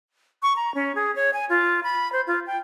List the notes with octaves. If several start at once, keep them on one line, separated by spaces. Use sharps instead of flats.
C#6
A#5
C#4
G#4
C#5
G#5
F4
B5
C5
F4
G5